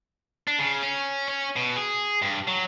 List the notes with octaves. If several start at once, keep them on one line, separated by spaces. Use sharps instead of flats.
D4
C#3
C#4
C#4
B2
G#4
G2
F#3